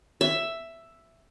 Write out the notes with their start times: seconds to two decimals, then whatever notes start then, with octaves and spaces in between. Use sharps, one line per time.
0.21 E5